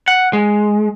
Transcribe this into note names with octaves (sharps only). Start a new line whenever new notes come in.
F#5
G#3